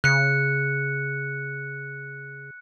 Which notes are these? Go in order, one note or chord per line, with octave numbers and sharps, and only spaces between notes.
C#3 F#6 C#7